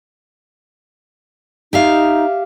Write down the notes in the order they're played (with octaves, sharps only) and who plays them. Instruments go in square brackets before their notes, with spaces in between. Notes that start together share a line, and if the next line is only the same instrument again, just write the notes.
[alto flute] D#4 [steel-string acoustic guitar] G4 E5 F5